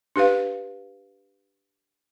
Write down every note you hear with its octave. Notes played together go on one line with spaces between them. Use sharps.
D4 G4 B4 F5